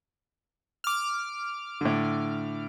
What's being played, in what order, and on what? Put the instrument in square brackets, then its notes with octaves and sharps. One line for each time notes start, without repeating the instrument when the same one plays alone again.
[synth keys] D6 F6
[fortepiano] A2 D3